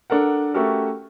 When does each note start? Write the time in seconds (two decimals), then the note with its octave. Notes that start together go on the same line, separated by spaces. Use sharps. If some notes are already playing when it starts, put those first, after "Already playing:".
0.10 D4 A4 A#4 F#5
0.54 A3 C#4 F#4 G4 A4 A#4